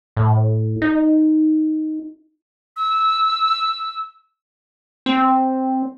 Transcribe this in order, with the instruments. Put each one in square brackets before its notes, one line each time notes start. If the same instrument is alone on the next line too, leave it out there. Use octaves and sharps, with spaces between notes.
[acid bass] A2
D#4
[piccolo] E6
[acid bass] C4